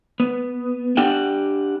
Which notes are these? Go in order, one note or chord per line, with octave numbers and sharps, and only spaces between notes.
B3
D4 G4 F#5 G5